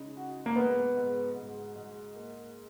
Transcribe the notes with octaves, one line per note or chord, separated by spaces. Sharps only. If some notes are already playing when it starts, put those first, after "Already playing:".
Already playing: C#3 G#3 D#4
F#4
A#3
G#2 B3
G#2
G#2
G#2
A#3